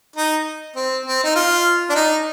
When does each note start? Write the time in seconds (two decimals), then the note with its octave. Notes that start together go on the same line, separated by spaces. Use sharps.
0.16 D#4
0.76 C4
1.06 C4
1.24 D#4
1.36 F4
1.89 D4
1.95 D#4